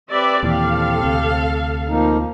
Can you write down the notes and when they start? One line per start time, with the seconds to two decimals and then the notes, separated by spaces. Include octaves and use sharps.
0.10 C4 G4 B4 D5 E5
0.43 D#2 A#2 E3 A4 F5
1.03 D2 C3
1.88 F3 A#3 D#4